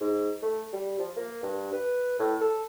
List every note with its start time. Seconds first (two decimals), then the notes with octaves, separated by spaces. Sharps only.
0.01 G#2
0.43 A3
0.73 G3
0.99 F3
1.16 A#3
1.43 G2
1.73 B4
2.19 A2
2.41 A4